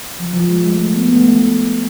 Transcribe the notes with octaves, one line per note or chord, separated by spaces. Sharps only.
F3
F3
G#3
G#3
A3
A3
B3
B3
A3
A3